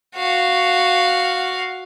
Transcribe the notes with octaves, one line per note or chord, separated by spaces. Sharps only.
F#4 F5